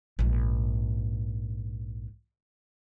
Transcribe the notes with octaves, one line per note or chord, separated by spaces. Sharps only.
A#1 G#2